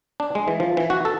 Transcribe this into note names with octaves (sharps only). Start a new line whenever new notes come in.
D4
G#3
E3
F3
E3
F#4
A4